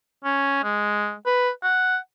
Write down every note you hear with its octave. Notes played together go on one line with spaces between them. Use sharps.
C#4
G#3
B4
F#5